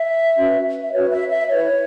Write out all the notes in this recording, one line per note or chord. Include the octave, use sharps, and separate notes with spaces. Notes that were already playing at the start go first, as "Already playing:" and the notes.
Already playing: E5
C#4 F#4 B4
E5
C#4 F#4 B4 C#5
E5
E5
E4 B4 C#5